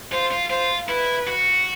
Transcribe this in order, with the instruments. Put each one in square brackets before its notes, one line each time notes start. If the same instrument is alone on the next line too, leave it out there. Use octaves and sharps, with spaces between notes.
[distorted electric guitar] F4 [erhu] C5
[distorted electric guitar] F4
[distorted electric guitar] F4 [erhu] C5
[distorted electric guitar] E4 [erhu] B4
[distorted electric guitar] F#4